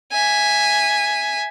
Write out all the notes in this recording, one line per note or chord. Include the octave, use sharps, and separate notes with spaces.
E5 G#5